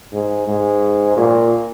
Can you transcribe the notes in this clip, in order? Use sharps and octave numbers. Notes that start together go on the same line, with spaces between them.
G#2
G#2
A#2